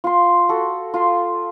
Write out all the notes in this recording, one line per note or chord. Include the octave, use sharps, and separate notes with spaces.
F4 C6
F#4 A4
F4 C6